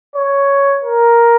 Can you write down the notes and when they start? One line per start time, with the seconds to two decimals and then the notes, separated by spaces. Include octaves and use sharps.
0.15 C#5
0.84 A#4